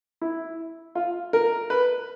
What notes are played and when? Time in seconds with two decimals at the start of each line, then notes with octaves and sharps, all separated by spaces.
0.21 E4
0.95 F4
1.33 A#4
1.70 B4